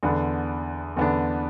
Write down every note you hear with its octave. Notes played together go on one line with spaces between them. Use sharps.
E2 D3 B3 D4
E2 D3 B3 D4